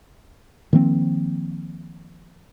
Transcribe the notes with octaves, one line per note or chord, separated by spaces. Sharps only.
D#3 F3 A#3 C4